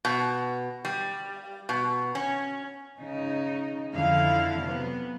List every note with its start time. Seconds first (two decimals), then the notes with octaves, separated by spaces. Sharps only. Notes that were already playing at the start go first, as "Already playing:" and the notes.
0.05 B2
0.85 G3
1.69 B2
2.15 C#4
2.98 C#3 D#4
3.94 F2 D3 E4 F5
4.58 C3 F#3 B3